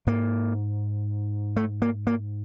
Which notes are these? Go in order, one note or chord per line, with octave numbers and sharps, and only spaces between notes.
G#2 A#3
A3
A#3
A#3